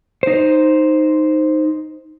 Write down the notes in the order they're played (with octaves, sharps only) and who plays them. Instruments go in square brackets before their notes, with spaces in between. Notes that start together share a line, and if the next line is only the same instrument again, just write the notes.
[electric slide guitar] D#4 C5